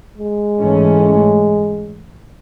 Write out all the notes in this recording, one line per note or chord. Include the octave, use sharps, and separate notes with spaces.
G#3
G#2 E3 A3 C#4